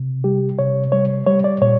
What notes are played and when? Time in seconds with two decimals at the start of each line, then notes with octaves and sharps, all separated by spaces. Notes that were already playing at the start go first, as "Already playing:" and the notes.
Already playing: C3
0.24 G3 G4
0.59 C3 C#5
0.92 G3 C#5
1.26 G3 C#5
1.44 D5
1.62 A#2 C#5